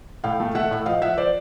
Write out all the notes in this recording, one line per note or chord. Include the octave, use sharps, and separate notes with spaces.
A2 F5 G5
A3
A3 E5 F#5
A2
F3 D#5 F5
F3 E5 F#5
F3 C5 D5